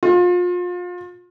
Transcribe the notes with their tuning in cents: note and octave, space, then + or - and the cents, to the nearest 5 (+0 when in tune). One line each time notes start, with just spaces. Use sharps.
F4 +30